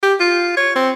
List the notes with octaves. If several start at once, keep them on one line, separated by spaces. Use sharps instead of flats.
G4
F4
C#5
C4